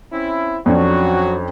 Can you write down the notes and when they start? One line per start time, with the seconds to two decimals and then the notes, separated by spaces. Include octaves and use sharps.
0.12 C4 C#4 E4
0.66 F2 F#3 C#4 D4 F#4